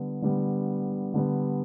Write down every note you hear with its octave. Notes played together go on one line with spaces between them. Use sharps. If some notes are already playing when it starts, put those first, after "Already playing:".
Already playing: D3 G3 B3
D3 G3 B3
D3 G3 B3